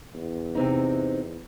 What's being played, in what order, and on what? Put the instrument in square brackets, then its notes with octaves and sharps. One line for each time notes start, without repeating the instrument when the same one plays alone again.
[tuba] E2
[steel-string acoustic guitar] C3 C4 D#4